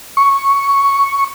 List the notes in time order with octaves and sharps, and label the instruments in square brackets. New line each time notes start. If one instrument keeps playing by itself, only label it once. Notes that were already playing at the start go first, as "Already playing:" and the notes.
[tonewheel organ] C#6